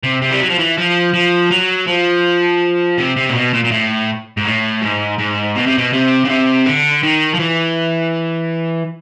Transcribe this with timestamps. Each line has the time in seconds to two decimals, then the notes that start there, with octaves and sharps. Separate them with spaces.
0.03 C3
0.22 C3
0.31 G3
0.41 F#3
0.50 F3
0.59 E3
0.78 F3
1.14 F3
1.51 F#3
1.88 F3
2.98 C3
3.16 C3
3.29 A#2
3.35 B2
3.53 A#2
3.64 A#2
3.71 A2
4.37 G#2
4.45 A2
4.82 G#2
5.19 G#2
5.56 B2
5.67 C3
5.78 B2
5.93 C3
6.25 C#3
6.29 C3
6.66 D3
7.03 D#3
7.35 F3
7.39 E3